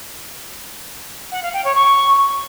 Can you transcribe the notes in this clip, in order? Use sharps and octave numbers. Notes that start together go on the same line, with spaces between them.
F#5
F5
G5
C#5
C#6